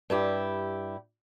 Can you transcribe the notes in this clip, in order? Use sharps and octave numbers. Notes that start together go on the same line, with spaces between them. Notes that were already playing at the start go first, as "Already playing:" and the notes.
G2 E4 G4